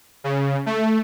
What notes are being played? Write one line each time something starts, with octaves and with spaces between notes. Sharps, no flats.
C#3
A3